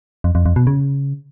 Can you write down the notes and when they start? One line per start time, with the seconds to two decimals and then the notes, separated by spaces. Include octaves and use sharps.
0.24 F2
0.35 F2
0.46 F2
0.56 B2
0.67 C#3